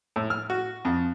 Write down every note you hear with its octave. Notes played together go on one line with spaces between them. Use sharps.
A2
F6
F#4
F2